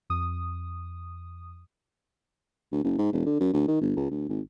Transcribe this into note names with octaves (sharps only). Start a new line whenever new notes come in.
F2 D#6
D2
F#1
G#2
E1
D3
F#2
D2
D#3
G1
C#2
D2
G#1